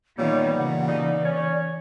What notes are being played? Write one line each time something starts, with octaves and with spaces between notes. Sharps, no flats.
A#2 D#3 G3 B3 D#4 C#5
C#3 E3 F#5
B2 D#4 D5
C#4 C#5